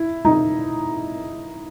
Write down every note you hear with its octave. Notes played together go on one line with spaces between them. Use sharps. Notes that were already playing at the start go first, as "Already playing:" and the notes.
Already playing: E4
D#4